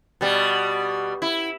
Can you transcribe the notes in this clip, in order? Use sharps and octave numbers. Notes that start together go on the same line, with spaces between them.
B2 G3
E4